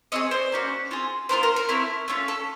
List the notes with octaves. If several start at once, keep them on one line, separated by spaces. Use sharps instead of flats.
C4 F4 G#4 C#5 D#5
C5 D5
A#3 C#4 F#4
C4 F4 G#4
B3 D4 F4 A#4 C5
A#4 C5
A#4
A3 C4 E4
A3 C#4 F4
A4